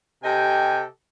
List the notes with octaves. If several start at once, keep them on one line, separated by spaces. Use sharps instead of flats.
C3 G4 A4 D#5 G5 G#5